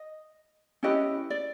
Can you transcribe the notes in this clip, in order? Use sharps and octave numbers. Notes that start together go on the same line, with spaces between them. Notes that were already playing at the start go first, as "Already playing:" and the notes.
Already playing: D#5
C#4 E4 G4 B4 D#5
D5